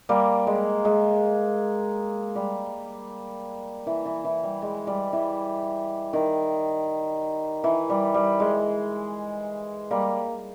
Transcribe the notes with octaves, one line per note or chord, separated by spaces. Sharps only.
G3 A#3
G#3
G#3
G3
E3
E3
E3
G3
G#3
G3
E3
D#3
E3
G3
G3
G#3
G3 A#3